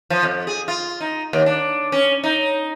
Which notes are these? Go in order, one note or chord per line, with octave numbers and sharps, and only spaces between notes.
F3
F2
G#4
F4
D#4
D#2
D4
C#4
D#4